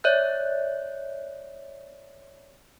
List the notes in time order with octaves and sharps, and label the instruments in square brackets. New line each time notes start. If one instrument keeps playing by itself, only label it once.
[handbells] C#5 D5 E5 F#6 G6